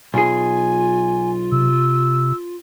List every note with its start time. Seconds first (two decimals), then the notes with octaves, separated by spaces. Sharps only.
0.14 B1 F4 G#4 G#5
1.52 C3 E6